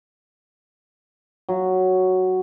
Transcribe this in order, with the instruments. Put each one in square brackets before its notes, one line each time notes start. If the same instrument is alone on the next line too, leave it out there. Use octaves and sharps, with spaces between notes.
[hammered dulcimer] F#3